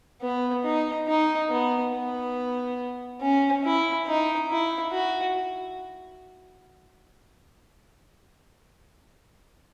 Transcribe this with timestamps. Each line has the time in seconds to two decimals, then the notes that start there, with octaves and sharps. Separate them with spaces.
0.22 B3
0.64 D#4
1.08 D#4
1.50 B3
1.93 B3
3.21 C#4
3.64 E4
4.07 D#4
4.50 E4
4.93 F#4